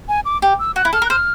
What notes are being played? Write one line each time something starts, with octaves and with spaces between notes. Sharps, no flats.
G#5
D6
G4
E6
F#4 F#6
E4
A4 F6
A#4
F#6
C5 F6